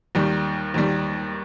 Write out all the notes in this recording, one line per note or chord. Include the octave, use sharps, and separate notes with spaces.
D#2 D#3 G3
D#2 D#3 G3